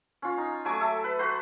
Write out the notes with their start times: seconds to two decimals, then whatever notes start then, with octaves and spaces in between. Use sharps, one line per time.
0.22 C#4 F4
0.38 D#4
0.65 F#3 A3 G#5 D6
0.81 A4 E5
1.04 B4
1.19 F#4 B4 C5